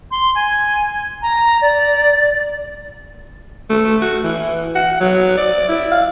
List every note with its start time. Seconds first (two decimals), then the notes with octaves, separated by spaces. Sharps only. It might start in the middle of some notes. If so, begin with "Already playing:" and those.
0.11 C6
0.35 G#5
1.22 A#5
1.62 D5
3.70 A3
4.02 F#4
4.24 E3
4.75 F#5
5.00 F#3
5.37 D5
5.69 E4
5.92 F5